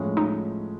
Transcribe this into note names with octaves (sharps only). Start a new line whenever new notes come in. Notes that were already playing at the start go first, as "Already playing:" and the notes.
Already playing: A2 F3 G#3 C#4
D#4